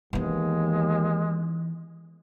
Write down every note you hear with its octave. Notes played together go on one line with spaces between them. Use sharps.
D#2 E3 G#3 B3